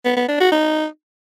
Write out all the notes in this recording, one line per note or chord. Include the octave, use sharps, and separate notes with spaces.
B3
B3
D4
F#4
D#4